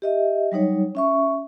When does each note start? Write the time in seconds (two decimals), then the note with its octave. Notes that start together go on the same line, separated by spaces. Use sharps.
0.02 G4 D#5 E5
0.52 F#3 G3 D#4 C#5
0.95 C#4 E5 C#6